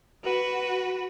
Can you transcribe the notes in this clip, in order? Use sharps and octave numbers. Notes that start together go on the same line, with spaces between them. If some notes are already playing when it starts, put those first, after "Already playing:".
F#4 B4